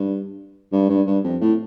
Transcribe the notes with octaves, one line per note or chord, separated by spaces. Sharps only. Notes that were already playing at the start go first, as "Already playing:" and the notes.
Already playing: G2
G2
G2
G2
F2
A2